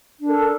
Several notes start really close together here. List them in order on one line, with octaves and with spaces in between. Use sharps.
D4 A#4 A4